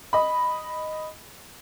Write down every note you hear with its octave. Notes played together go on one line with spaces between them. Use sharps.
D#5 B5